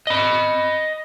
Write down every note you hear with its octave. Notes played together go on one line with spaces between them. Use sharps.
D#5 B5